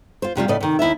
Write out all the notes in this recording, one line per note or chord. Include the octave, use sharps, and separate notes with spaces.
F4 C5
F2 C3 G3 F4
A2 C#3 D5 D#5
C3 D#3
D#2 E4 D#5 E5